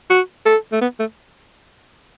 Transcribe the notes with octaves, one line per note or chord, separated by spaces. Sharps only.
F#4
A4
A3
B3
A3